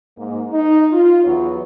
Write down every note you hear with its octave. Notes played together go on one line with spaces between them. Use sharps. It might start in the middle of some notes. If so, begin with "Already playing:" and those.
G#2 A#3
D#4
F4
E2 F#3